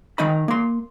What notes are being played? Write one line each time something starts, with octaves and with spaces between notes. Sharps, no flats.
D#3 D#4 D#5 B5
A#3 C6